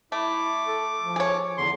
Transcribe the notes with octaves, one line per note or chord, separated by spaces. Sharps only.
A3 E4 D6
A4
F3
G#4 C#5
E2 D3 C6